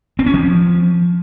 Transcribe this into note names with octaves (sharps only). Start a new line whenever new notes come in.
C4
C#4
F3